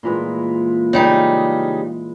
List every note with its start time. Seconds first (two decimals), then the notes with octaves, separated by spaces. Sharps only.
0.03 A#2 E3 G#3
0.93 C#3 G3 D#4